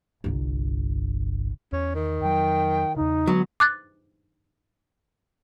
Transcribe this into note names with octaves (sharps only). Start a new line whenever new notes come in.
G1 C2
E2 C#4
D#3
F2 F#3 G5
E2 C#3 D#4
D3 F#3 G#3 B3
D6 F#6 A6